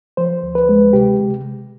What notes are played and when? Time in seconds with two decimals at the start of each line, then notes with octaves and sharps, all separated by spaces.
0.17 F3 C5
0.43 D2
0.55 B4
0.69 G#3
0.93 C3 G4
1.19 C3